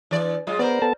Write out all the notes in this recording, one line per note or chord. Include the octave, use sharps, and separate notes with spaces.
E3 D5
F#3 G#3 F4
B3 A#4 C5 D5
B3 A4 A5